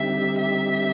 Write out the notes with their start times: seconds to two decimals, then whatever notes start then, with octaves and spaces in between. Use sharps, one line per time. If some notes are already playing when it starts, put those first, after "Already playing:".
Already playing: D3 G3 C4 D#4 G4 E5
0.38 E5